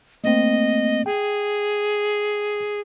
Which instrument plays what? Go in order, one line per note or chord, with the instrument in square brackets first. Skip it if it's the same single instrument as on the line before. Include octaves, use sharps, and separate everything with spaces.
[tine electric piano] A3 A#3 C4 [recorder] D#5
[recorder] G#4 [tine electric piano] G5